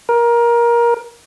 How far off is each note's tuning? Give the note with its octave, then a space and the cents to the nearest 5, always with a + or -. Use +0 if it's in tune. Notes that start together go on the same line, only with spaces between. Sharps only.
A#4 +20